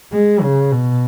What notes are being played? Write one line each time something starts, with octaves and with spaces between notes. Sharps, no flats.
G#3
C#3
B2